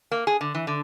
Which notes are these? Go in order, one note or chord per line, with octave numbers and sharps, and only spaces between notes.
A#3
G#4
D3
E3
D3